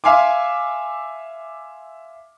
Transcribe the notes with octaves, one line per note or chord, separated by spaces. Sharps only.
E5 F5 G#5 C6 D6